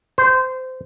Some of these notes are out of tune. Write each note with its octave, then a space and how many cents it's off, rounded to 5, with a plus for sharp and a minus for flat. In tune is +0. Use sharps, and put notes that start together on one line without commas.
C5 -20